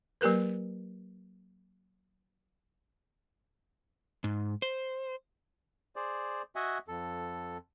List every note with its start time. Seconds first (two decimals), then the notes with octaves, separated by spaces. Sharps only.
0.21 F#3 A#3 G4 A#4 B4
4.24 G#2
4.62 C5
5.96 G#4 C5 D5
6.56 F#4 D#5 E5 F#5 G#5
6.88 F2 A4